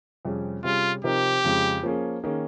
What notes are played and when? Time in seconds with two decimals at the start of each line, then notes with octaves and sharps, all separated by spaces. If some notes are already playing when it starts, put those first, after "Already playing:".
0.25 F2 C3 G3 C#4 G#4
0.64 C3 G3 C#4 F4 G#4
1.04 C3 F3 C4 D#4 G4 A#4
1.44 F2 C#3 G#3
1.83 F3 A#3 C#4 G#4
2.24 D#3 A#3 C#4 G#4